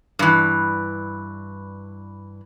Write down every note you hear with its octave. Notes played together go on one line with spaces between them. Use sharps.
G2 E3